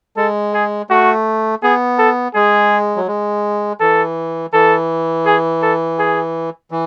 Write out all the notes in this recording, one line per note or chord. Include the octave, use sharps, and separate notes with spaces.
G#3 A4
G#4
A3 F#4
B3 G#4
A4
G#3 G#4
F#3
G#3
E3 A4
E3 A4
G#4
A4
G#4
E3